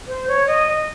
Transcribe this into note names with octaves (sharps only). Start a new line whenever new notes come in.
C5
C#5
D#5
D#5